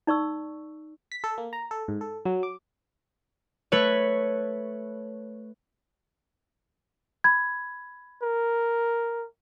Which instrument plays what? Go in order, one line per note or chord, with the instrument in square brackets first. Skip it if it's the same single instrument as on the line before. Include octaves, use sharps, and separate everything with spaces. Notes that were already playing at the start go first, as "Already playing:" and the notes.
[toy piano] D#4 D5 C#6 E6
[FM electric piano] B6
A4
A#3
A#5
A4
G#2
A4
F#3
D6
[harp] A3 B4 C#5
[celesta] B5 G#6
[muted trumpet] A#4